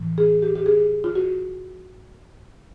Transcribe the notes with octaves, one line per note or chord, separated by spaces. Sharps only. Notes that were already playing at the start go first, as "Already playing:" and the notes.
Already playing: A2 E3
G#4
G4
G4
G#4
F4
F#4